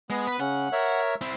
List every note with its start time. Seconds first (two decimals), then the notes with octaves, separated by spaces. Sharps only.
0.10 G#3 B3
0.27 B4
0.40 C#3 C#4 F#5
0.72 A#4 C#5 E5
1.21 C4 E4